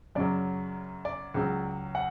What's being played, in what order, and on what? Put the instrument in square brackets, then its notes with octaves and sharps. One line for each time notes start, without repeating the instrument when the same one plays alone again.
[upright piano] F#2 C#3 F#3 D5
D5
C#2 C#3 F#3
F#5